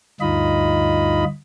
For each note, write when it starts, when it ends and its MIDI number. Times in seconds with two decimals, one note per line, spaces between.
0.21 1.24 38
0.21 1.24 43
0.21 1.24 63
0.21 1.24 65
0.21 1.24 75
0.21 1.24 83